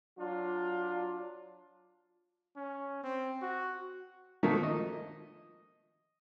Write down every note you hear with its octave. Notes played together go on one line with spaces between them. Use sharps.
F#3 D4 F4
C#4
C4
F#4
B2 D#3 F3 A3 A#3
D#5